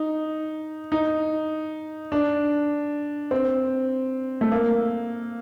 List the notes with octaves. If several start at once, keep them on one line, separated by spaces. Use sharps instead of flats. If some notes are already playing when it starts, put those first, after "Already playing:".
Already playing: D#4
D#4
D4
C4
A3
A#3